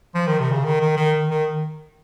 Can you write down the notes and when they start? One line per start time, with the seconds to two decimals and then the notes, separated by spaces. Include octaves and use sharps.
0.15 F3
0.27 D#3
0.40 C3
0.52 C#3
0.65 D#3
0.81 D#3
0.97 D#3
1.30 D#3